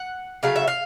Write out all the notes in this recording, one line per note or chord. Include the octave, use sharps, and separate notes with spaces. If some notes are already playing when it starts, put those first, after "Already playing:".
Already playing: F#5
C#3 F#3 A3 F5
E5
F5